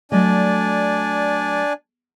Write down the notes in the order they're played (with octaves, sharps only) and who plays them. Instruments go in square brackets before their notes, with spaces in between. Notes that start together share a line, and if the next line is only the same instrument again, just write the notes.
[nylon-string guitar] F#3 A3 D#5 [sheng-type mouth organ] D4 D5 G#5